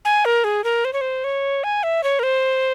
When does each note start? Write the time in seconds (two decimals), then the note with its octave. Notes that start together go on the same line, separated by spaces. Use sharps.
0.05 G#5
0.25 A#4
0.44 G#4
0.64 A#4
0.85 C5
0.93 C#5
1.01 C5
1.24 C#5
1.64 G#5
1.83 E5
2.04 C#5
2.19 A#4
2.23 C5